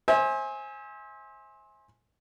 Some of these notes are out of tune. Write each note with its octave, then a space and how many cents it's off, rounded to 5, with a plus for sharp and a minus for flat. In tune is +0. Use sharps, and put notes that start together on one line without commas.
C5 +25 E5 -35 G#5 +0